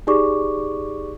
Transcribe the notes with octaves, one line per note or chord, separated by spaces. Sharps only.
D#4 G4 G#4 D5 C#6 D6